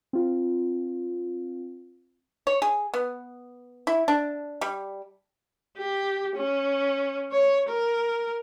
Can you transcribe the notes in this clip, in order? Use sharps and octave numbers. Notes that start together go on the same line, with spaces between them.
C4 F4
C#5
G#4
B3
E4
D4
G3
G4
C#4
C#5
A#4